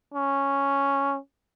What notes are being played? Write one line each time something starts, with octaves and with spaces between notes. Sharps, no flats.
C#4